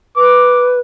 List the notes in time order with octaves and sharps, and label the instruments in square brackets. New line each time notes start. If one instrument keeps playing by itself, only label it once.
[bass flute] B4 [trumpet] D6